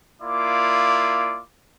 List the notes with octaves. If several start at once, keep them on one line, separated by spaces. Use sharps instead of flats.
A#3 E4 F4 D5 D6